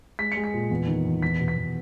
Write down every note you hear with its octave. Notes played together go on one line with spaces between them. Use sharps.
G#3 B6
G#3 C#7
B6
A#2
E2
D#3
E2
E2 B6
B2
B6
E2